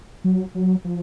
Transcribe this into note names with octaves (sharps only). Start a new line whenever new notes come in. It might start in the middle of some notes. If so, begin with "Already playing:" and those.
F#3
F#3
F3